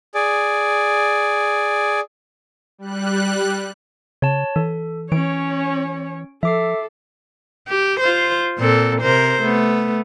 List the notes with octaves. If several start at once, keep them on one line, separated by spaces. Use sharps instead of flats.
G#4 D5
G3 F#6
C#3 C#5 A5
E3 A4
E3 C#4 C#5 D7
F3 A4 E5 D6 C7
G4
F4 C5
A#2 C4 A4
C3 A#4 C5
A3 B3